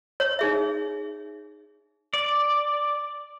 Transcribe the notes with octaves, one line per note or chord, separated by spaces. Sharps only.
C#5
D#4 G#4 E5
D5